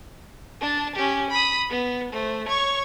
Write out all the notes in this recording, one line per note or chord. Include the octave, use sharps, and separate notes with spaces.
D4 A5
C#4 G4
B5 D#6
B3
A3 C5
C#5 C#6